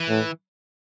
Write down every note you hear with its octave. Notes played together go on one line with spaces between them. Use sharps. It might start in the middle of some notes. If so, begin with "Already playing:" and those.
Already playing: E3
A2